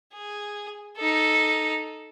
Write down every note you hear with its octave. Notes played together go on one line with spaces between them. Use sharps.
G#4
D#4 A4